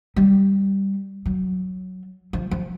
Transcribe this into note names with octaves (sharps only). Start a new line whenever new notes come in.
G3
F#3
F3
F3